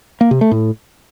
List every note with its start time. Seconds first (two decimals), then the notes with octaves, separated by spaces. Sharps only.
0.21 A#3
0.31 C3
0.41 A3
0.51 A2